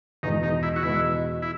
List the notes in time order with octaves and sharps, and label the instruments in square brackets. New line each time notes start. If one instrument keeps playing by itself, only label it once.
[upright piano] E2 B2 G#3 [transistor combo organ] D#4
[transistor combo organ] D#4
E4
F#4
[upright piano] E2 B2 G#3 [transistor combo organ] E4
[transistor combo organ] E4